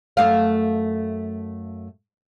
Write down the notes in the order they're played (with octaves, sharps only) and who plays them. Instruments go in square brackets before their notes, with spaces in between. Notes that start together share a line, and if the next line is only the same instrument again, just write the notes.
[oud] F#2 A3 F5